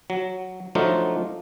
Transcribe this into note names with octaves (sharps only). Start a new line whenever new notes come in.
F#3
F3 F#3 A3 D4 D#4 F4